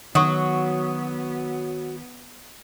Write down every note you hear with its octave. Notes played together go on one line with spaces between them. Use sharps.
D#3 F#3 B3 C#6 D#6